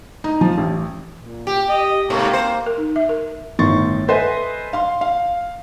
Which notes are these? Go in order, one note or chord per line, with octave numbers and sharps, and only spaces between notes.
D#4
F3
A1
A#2
G4
D#5
G#2 C3 A3 A#3
C5
A#4
D#4
E5
A#4
G1 A2 D#3 C6 C#6 A6
A4 B4 C5 D#5 E5 G#5
F5 C6
F5